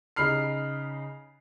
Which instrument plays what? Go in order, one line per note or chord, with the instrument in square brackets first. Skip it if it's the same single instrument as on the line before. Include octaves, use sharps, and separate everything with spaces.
[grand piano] C#3 D#4 B5 F6 C7